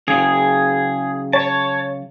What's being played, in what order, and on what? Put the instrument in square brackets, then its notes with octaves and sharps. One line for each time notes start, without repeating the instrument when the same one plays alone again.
[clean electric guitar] C#3 F#3 [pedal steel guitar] G#4
[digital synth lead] C#5 [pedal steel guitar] A5